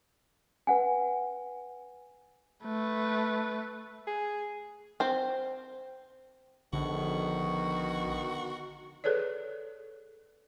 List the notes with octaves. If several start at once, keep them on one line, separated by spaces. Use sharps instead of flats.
B4 F#5 G#5
A3 B4
G#4
C4 C5
A#1 B2 D3 D#3 F#4
G#4 A4 B4 C#5 D5